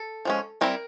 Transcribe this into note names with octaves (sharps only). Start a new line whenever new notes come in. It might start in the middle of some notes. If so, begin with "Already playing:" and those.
Already playing: A4
F3 G#3 C#4
G3 C4 E4 A#4